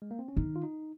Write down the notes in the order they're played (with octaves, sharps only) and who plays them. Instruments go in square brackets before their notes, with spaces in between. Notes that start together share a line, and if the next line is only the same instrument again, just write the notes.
[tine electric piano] G#3
A#3
C4
C#4
[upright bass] D#3 [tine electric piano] D#4
[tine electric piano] F4
D#4